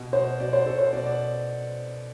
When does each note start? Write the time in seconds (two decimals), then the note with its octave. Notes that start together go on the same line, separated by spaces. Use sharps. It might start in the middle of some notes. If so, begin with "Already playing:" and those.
Already playing: B2
0.13 B2 C5
0.40 B2 D5
0.53 C5
0.66 B2 A4
0.79 C5
0.93 B2 D5
1.06 D5